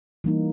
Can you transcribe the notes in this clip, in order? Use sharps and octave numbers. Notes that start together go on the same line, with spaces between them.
E3 G3 A#3 D#4